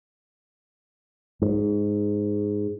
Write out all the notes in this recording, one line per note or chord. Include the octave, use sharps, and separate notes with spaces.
G#2